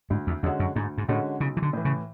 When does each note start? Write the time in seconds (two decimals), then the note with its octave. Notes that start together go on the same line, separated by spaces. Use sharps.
0.10 D2 G#2
0.27 E2
0.43 E2 D3 G#3 C#4 F#4
0.59 F#2
0.76 D2 G#2
0.98 G#2
1.08 A2 D3 G#3 C#4 F#4
1.40 B1 C#3
1.57 E3
1.62 D3
1.73 A2 E3
1.85 C#3